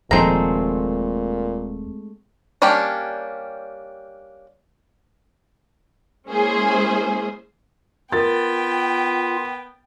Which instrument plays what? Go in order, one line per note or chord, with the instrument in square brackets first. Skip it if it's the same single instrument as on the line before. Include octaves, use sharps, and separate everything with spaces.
[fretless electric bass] D#1 F3 [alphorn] A#2 [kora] G#3 A3 C4 [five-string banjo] C5 A#5
[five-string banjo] G3 A#3 C#4 D4 G4
[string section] G#3 A#3 C#4 E4 G#4 C5
[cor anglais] B3 [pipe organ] F4 [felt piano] A#4 A6 [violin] G5